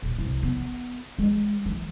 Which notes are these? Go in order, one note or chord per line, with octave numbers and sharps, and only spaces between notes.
D#1
C2
B3
G#3
E3